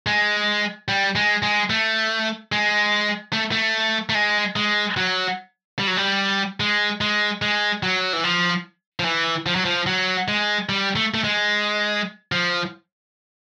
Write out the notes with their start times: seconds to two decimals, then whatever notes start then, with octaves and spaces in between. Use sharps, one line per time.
0.06 G#3
0.88 G3
1.15 G#3
1.43 G#3
1.70 A3
2.52 G#3
3.33 A3
3.52 A3
4.09 A3
4.15 G#3
4.56 G#3
4.97 F#3
5.79 G3
5.87 F#3
5.97 G3
6.60 G#3
7.01 G#3
7.42 G#3
7.83 F#3
8.13 E3
8.24 F3
9.00 F3
9.05 E3
9.46 F3
9.55 F#3
9.65 F3
9.87 F#3
10.28 G#3
10.69 G3
10.96 A3
11.14 A3
11.24 G#3
12.32 F3